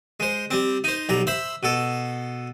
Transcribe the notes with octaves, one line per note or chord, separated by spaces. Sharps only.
G#3 C5
G3 C4
D#4 C5
B1 G3 A#5
C5 E5 B5
B2 A4